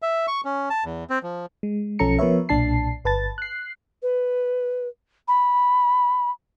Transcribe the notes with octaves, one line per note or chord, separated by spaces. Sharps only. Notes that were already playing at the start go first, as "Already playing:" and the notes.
E5
C#6
C#4
A5
E2
C4
F3
G#3
B1 F3 C#4 A4 A#5 C#7
F3 B3 A#4 B4 C#5 E5
B1 A#2 D4 A5 C7
G1 B4 A5 A6
F#6 C7
B4
B5